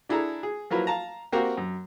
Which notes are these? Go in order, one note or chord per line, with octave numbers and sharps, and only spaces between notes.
D4 E4 G#4 A4 A#5
G#4
F3 F#3 E4 A#4 B4
F5 A5 A#5
A#3 C4 F#4 G4 A#4
F#2